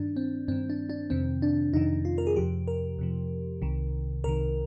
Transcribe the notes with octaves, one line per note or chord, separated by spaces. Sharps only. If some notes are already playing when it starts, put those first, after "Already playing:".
Already playing: G2 D#3 D4
C4
G2 D#3 C4
D4
D4
F2 C3 D#3 C4
D4
F2 C3 D#3 D#4
F4
A#4
G#4
F2 C3 F3 G4
A#4
F2 C3 F3
C2 C3 D#3
C2 C3 D#3 A#4